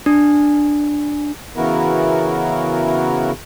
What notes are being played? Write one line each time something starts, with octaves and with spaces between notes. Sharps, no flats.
D4
C#3 E3 B3 E4 F#4 A#4